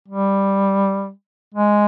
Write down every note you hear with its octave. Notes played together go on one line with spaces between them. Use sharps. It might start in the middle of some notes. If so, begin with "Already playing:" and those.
G3
G#3